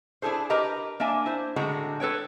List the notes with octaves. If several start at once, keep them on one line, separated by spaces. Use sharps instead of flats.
D4 E4 G#4 A4 C5
G4 A#4 B4 D#5 A#5
A#3 D4 E5 G#5
E4 C5
A2 D3 G#3 F#4 A#5
A4 B4 C#5 G5